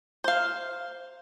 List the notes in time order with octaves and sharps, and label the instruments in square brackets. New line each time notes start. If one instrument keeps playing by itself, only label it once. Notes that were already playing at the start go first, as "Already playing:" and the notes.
[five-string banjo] C5 F5